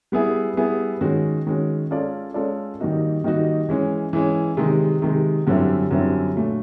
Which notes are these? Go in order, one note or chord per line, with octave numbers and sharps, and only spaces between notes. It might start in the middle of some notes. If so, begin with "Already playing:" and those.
G3 B3 E4 G#4
G3 B3 E4 G#4
D#3 G#3 C#4 F#4
D#3 G#3 C#4 F#4
G#3 C#4 F4 A4 D5
G#3 C#4 F4 A4 D5
D#3 G3 A#3 D#4 F#4
D#3 G3 A#3 D#4 F#4
E3 G#3 C#4
E3 G#3 C#4
C3 D#3 G#3
C3 D#3 G#3
F#2 D3 G3 C4 E4
F#2 D3 G3 C4 E4
A#2 F#3 A3 D4